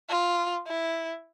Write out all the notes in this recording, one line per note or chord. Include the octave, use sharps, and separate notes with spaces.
F4
E4